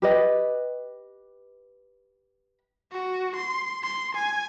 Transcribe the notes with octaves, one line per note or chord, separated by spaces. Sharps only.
G4 B4 D#5
F#4
C6
C6
G#5